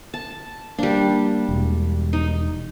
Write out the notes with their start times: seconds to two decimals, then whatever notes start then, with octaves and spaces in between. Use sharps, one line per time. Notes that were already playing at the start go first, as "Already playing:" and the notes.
0.14 A5
0.79 G3 A#3 D4
1.49 E1
2.13 D#4